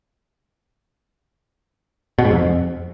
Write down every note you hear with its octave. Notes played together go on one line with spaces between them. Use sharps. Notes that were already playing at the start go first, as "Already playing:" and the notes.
B2
G#2
F2